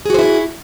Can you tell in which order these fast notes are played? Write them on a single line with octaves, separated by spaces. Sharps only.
G#4 F#4 C5 E4